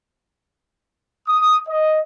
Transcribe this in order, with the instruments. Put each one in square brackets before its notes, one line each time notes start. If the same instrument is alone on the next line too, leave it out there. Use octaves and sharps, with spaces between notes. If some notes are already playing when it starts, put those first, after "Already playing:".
[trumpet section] D#6
D#5